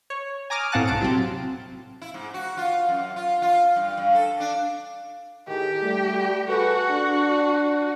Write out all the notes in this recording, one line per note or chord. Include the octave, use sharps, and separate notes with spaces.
C#5
G#5 A#5 D6 D#6 F6
A2 C4 F5 F#5 A5 F#6
B1 A2 A5 D7
C3 F#3 C4
E4
G#2
F#4
F4
F#2
F4
F4
G2
G2
A4
D4
A2 D#3 G4 G#4
G3 A3
F#4 G#4 A4 B4
D4